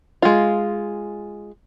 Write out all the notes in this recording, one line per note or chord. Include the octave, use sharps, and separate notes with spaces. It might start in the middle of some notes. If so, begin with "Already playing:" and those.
G#3 F4